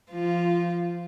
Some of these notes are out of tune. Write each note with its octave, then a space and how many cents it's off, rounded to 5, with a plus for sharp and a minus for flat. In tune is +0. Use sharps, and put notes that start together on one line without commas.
F3 -20 F4 -5